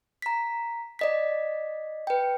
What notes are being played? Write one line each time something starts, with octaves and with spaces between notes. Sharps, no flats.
A#5 B6
D5 D#5 B6
B4 G5